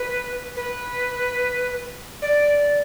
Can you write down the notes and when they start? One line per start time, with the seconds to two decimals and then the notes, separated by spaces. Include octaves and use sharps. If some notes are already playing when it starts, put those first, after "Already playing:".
Already playing: B4
0.56 B4
2.22 D5